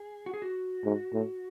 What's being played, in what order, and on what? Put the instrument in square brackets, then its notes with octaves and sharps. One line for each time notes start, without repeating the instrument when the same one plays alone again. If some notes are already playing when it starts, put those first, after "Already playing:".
Already playing: [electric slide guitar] G#4
F#4
G#4
F#4
[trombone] G#2
A2